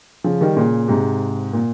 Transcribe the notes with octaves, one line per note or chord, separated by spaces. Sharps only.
C#3 F3
D#3 G3
A#2 C#3
G#2 C3
A#2